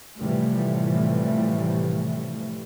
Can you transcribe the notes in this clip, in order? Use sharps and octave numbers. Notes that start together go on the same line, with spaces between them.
A2 C3 E3 F3 G3 A3